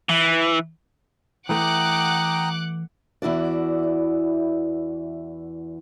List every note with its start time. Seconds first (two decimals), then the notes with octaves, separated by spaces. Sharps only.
0.09 E3
1.49 E3 A3 F#5 G5 A#5 D6 D#6 F#6
3.22 E2 E3 E4 F#4 D5